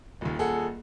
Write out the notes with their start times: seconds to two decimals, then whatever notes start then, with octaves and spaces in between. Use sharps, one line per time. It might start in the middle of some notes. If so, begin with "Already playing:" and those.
0.21 D#1 D#2
0.39 D#1 G#4 A4 F#5